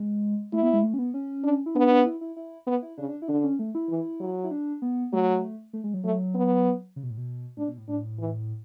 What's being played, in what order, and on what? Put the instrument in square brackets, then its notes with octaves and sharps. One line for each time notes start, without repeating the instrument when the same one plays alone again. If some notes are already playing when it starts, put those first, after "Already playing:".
Already playing: [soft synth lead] G#3
[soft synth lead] A3 [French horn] E4
[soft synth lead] B3
G#3
A3
C#4
B3
C#4
[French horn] D4
[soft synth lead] E4
[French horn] B3 [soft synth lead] D4
[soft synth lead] D4
E4
E4
E4
[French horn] B3
[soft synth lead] E4
[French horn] C#3 [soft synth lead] D4
[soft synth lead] D4
E4
[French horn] D3 [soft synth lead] D4
[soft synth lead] C#4
A3
E4
[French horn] E3
F#3
[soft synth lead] E4
D4
B3
[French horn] F#3 [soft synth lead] A3
[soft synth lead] A3
G#3
F#3
[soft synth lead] F#3 [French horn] A3
[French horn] B3
[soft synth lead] C#3
B2
A2
B2
[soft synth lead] A2 [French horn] D4
[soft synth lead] B2
A2
[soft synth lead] A2 [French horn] D4
[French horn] E3